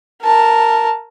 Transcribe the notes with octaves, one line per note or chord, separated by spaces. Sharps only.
A#4 A5